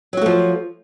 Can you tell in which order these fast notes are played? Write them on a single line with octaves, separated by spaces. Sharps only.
F#3 F#4 A3 F3